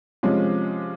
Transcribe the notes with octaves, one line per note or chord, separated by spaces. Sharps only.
C3 F3 G#3 C#4